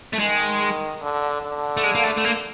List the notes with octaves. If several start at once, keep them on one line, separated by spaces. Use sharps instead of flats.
A3
D#3 G#3
D3
D3
A3
G#3
A#3
A3
A3
A#3